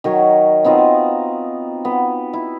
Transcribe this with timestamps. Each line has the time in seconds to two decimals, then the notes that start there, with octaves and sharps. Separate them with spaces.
0.04 D#3 F#3 C#5
0.64 B3 C4 D#4 F4
1.85 B3
2.33 E4